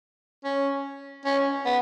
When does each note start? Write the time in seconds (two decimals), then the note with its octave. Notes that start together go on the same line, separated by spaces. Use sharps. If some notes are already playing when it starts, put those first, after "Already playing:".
0.44 C#4
1.25 C#4
1.66 B3